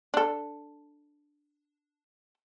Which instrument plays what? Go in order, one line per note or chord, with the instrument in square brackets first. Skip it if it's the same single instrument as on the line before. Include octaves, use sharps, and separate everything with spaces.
[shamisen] D4 A4